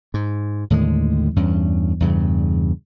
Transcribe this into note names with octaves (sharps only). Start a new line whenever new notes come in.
G#2
D#2 A2 D3 G#3
E2 G2 C#4
E2 G2 C#3